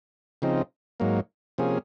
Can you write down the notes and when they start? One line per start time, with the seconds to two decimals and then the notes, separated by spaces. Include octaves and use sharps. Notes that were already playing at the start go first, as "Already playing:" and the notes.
0.42 C#3 F3 C4 D#4
1.00 G#2 F#3 A#3
1.58 C3 F3 A#3 C#4 G#4